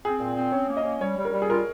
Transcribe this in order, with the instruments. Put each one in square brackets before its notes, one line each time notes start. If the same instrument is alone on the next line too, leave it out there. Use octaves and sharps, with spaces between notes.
[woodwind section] C4 [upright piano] G#4
[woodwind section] A#2
C4
[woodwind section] C#4 [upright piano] C#5
[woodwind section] A#3
[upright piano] D#5
[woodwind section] C#4
[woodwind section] G3 [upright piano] C#5
[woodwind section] G3
[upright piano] A#4
[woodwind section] G3
[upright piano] G#4
[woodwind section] F4 [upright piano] A#4